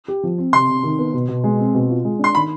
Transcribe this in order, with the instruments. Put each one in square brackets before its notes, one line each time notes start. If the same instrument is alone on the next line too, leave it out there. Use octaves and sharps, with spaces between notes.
[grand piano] G4
F3
C4
[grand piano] C3 [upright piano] C6
[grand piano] C3
D#3
B3
B2
B2
G#3
C4
B2
F4
G#3
[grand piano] D4 [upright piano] C6
[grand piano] D#3 [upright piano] B5